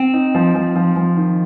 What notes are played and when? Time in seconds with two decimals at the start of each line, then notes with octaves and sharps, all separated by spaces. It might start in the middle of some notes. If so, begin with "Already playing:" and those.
Already playing: C4
0.14 D#4
0.35 F3
0.55 F3
0.76 F3
0.96 F3
1.17 D#3